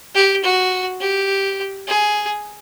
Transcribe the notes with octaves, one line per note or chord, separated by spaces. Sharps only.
G4
F#4
G4
G#4